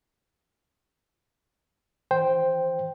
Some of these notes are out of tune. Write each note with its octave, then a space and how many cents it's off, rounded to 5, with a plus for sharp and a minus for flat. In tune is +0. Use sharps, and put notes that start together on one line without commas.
E3 -35 C5 +0 G5 +0